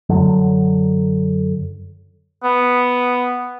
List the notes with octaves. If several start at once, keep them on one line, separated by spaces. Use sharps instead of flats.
F#2 D3 F#3
B3